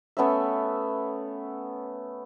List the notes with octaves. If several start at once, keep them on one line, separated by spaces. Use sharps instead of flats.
A3 B3 C#4 E5